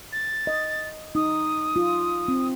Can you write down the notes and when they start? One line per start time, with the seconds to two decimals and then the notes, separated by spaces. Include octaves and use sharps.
0.12 A6
0.47 D#5
1.15 D#4 D#6
1.76 F4
2.28 C4